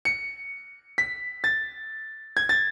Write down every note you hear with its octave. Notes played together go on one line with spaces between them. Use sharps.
C#7
B6
A6
G#6
A6